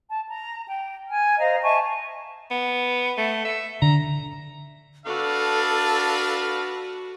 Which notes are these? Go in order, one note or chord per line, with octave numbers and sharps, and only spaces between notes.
A5
A#5
G5
G#5 F6
C5 D#5 F5 A#5
E5 G#5 A5 C#6
B3
A3
E5
D3 A#5
D4 F#4 A4 B4 F5